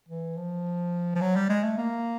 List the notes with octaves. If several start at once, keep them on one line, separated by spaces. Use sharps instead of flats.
E3
F3
F3
F#3
G3
G#3
A3
A#3